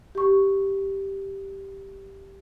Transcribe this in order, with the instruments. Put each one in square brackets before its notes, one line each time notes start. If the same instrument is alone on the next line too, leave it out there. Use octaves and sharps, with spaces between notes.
[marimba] G4 C#6